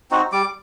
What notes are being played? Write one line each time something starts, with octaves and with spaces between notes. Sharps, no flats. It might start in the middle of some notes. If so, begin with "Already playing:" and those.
C4 D#4 F#4
G3 D6